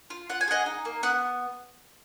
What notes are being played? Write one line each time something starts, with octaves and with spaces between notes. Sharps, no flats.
F4
F4 F#5
G#5
G#4 D#5 F#5
D#4
A#3
B3 F#5